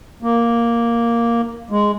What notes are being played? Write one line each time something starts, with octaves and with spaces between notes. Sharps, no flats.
A#3
G#3